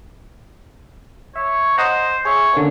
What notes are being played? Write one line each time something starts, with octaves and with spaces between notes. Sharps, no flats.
C#5 E5
C5 D#5 F#5 A#5
G#4 C#5 E5
D3 A#3 C#4